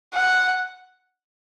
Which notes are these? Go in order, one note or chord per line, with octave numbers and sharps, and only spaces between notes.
F#5